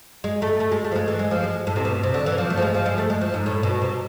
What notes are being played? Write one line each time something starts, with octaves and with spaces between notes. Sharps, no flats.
G#3
A3
A3
G#3
A3
F3
G#3
E3
G#3
F3
G#3
A2
C3
B2
C3
D3
E3
F3
A3
F3
G#3
F3
G#3
A3
G#3
F3
G#2
A2
B2
C3